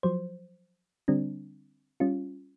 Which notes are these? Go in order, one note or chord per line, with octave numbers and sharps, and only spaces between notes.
F3 F#3 C5
D3 G3 C4 D4
G3 C#4 F4